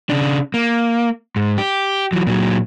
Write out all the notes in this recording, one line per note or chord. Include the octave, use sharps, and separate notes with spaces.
C#3 D4
A#3
G#2
G4
E3 F#3
A#2 F#3